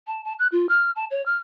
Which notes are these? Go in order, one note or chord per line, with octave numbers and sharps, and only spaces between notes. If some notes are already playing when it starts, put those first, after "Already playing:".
A5
A5
F#6
F4
F6
A5
C#5
F6